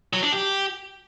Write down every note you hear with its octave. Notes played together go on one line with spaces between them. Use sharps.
F#3
D4
G4